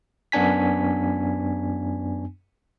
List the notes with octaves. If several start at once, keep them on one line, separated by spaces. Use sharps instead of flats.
F#2 B3 D4 G#5 B6